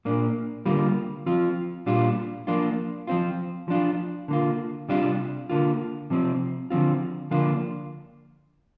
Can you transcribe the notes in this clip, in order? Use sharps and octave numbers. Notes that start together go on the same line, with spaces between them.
A#2 A#3 D4
D3 G3 A#3 F4
F3 C4 F4
A#2 G3 D4 F4
F3 A#3 D4 F4
F3 C4 F4
F3 D4 F4
D3 A#3 F4
C3 G3 D4 F4
D3 A#3 F4
C3 F3 C4
D3 F3 C4 F4
D3 F3 A#3 D4 F4